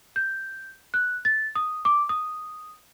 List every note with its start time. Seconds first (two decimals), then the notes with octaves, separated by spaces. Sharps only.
0.16 G6
0.94 F#6
1.25 A6
1.56 D#6
1.85 D6
2.09 D#6